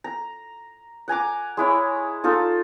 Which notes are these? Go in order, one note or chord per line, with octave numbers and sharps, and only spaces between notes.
A#5
F#5 G#5 A#5 D6
G#3 E4 C#5
D#4 F4 A4